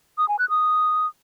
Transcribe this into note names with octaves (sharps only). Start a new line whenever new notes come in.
D#6
G#5
F#6
D#6